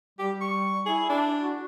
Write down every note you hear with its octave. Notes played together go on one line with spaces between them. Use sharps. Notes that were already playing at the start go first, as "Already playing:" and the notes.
G3 G4
C#6
E4 G#4
D4
F#4